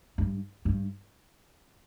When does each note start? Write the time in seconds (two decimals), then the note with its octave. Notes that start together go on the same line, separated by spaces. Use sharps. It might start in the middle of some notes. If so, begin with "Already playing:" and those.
0.18 G2
0.65 G2